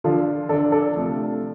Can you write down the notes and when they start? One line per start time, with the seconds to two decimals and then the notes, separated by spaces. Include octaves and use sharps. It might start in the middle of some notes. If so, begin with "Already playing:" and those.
0.04 D3 F3 D4 F4 A4
0.49 D3 F3 D4 A4 D5
0.72 A4 D5
0.96 C3 F3 A3